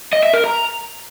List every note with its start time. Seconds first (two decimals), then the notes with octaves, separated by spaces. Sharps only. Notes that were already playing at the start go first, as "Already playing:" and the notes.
0.13 D#5
0.23 E5
0.34 A#4
0.44 A#5